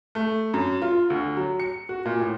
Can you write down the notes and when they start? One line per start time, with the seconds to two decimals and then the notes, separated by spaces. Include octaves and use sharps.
0.15 A3
0.54 F#2
0.82 F4
1.10 D2
1.37 F#3
1.60 C#7
1.89 F#4
2.05 A#2
2.21 A2